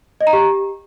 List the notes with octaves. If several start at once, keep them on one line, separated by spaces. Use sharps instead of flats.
D#5
A#5
G4